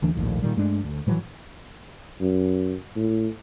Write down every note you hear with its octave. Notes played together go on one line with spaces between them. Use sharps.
D#1 D2 E3 D4
A#1 D#2 A2 F3
A#2 D#3 G3
G2 G#3 A3 D4
D2
A2 D#3 E3 F#3
F#2
A2